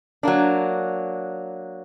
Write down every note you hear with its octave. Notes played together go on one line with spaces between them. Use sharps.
F#3 A#3 D4